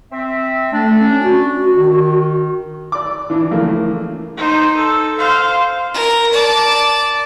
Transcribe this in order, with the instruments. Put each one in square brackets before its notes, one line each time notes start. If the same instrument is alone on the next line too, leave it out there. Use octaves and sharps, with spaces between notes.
[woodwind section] C4 E5
[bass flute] A3 [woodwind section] D4
[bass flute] C#4
F#4
[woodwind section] D#3
[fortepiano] D5 D6
E3 D4 E4
C#3 E3 F3 A3 A#3
[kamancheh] D#4 C5
A4
C5 F5
[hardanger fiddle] A#4
D5 A5